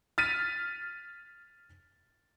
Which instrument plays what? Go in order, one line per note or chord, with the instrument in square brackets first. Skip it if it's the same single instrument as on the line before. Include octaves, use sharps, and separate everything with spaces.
[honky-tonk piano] F6 A6 B6 D#7